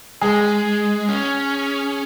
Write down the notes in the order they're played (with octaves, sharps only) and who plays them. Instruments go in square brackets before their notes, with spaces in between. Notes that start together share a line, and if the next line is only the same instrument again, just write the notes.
[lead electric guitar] G#3 [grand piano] G#4
[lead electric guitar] C#4